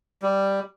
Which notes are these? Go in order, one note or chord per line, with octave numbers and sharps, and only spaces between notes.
G3